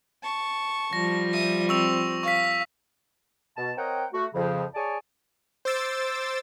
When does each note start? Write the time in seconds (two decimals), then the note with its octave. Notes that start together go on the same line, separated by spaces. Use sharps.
0.22 A5 C#6
0.93 F3 G3 A#6
1.32 E5 D#6
1.69 C4 C#6 E6 F7
2.23 F5 C#6 B6
3.56 B2 A5
3.77 C4 A#4 C#5 D#5 F#5 G5
4.13 A3 F#4
4.34 F2 C#3 F3
4.75 G#4 C#5 D5 G#5 A5
5.65 C5 D6 E6 A6